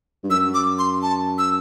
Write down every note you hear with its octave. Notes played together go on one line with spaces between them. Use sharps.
G2
F#2 E6
D6
C6
A5
E6